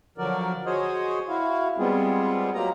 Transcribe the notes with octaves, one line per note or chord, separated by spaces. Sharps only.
D3 F3 F#3 F#4 A#4 D5
F#4 G#4 C5 C#5 D#5
E4 F#4 F5
G3 G#3 B3 C4 F4 G#4
F#3 A#3 G4 A#5